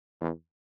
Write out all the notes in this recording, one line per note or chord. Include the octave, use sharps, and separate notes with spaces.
E2